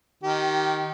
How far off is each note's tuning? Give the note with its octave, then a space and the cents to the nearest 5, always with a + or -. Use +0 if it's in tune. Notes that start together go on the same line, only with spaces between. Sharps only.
D#3 +0 G4 -30